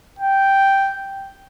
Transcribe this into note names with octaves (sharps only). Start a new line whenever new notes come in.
G5